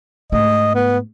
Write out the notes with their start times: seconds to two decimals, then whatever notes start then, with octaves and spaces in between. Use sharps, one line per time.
0.32 G#2 A3 D#5
0.75 B3